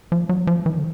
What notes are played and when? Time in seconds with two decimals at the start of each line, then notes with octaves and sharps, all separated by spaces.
0.12 F3
0.29 F#3
0.47 F3
0.66 E3
0.78 D3